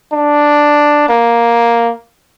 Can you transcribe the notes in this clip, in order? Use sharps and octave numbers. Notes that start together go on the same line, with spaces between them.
D4
A#3